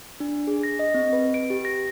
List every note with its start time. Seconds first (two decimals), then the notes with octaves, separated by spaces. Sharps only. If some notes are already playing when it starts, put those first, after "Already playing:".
0.20 D4
0.47 G#4
0.63 A#6
0.79 D#5
0.94 C4
1.13 B4
1.34 D7
1.50 G4
1.65 A#6